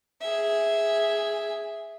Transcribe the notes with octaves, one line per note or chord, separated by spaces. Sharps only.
G#4 E5